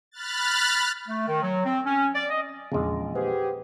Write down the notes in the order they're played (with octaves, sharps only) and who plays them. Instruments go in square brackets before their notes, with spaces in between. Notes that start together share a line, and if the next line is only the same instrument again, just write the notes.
[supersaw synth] B5 F6 F#6 A6
[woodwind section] A3
D#3
F#3
C4
C#4
D5
D#5
[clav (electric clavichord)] A#1 G#3 [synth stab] E2 C#3
[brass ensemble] G4 G#4 [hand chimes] B4 C5 F#5